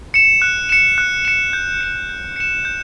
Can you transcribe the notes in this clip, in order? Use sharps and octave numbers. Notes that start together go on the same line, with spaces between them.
C#7 E7
F#6
C#7 E7
F#6
C#7 E7
G6
C#7 E7
G6
C#7 E7
G6